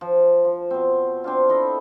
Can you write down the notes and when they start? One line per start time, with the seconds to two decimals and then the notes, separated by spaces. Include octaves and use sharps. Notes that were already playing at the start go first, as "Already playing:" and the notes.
0.01 F3
0.44 F3
0.71 B2 C4
1.24 C4 D4 F4
1.49 E4 A4 D#5